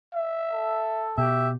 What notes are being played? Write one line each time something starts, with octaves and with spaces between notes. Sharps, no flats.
E5
A4
B2 G4 E5